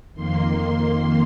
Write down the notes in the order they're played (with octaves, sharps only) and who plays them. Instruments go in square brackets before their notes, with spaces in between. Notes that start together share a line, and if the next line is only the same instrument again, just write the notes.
[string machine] F2 D#3 A#3 C6